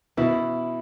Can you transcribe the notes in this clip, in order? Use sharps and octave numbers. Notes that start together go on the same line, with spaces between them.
B2 E4